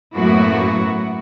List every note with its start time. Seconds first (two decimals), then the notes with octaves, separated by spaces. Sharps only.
0.16 F#2 A2 A#3 B3 E4 F#4